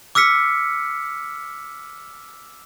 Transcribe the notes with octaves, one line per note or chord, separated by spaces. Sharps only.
D6 E6 F6 B6 C#7